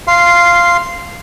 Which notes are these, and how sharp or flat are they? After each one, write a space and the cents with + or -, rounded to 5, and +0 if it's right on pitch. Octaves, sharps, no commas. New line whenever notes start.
F5 -10 C6 +0